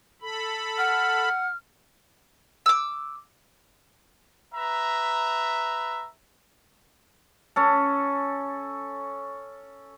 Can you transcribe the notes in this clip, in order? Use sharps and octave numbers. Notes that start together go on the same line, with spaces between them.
A4 B5
F#5 F6
D6 E6
B4 E5 A#5
C#4 A4